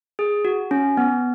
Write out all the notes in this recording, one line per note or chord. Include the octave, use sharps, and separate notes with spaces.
G#4
F#4
C#4
B3